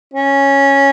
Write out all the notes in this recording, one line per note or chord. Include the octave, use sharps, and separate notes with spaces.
C#4